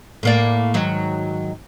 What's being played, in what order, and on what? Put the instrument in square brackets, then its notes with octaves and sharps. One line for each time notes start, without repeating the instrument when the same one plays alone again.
[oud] A2 A#3 D5
G#2 D#3 F#3